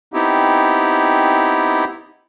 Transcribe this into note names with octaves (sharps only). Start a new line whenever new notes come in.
B3 C4 D#4 E4 G4